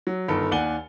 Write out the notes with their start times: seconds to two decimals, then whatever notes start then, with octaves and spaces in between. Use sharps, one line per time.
0.07 F#3
0.28 G1 D#3 A4 B5
0.51 D#2 D5 F#5 G#5 G7